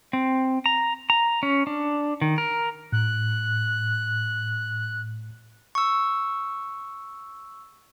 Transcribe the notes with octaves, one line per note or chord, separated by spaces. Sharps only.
C4
A#5
A#5
C#4
D4
D#3
A#4
A2 F#6
C#6 E6